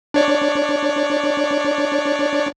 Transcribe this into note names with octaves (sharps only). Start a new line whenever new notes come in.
D4 C#5 D5